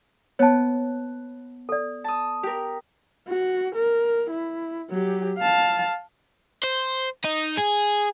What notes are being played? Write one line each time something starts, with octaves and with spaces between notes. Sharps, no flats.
B3 C#5 A5
A4 D5
A5 D#6
G4 A#4
F#4
A#4
E4
F#3 G4
F5 A5
C5
D#4
G#4